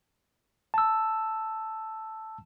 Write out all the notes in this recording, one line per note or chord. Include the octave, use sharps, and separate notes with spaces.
A5 E6